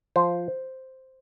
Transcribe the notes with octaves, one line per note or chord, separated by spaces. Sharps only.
F3 C5